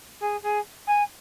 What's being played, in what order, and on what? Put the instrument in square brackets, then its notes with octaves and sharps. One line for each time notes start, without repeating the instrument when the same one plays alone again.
[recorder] G#4
G#4
G#5